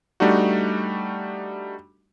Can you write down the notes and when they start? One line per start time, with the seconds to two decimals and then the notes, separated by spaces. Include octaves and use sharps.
0.20 G3 A3 D4 D#4 F#4